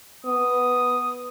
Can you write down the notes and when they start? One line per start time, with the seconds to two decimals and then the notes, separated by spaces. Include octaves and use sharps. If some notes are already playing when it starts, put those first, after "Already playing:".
0.25 B3 D#6